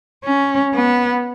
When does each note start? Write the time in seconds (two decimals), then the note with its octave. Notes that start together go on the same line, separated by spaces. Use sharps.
0.24 C#4
0.74 B3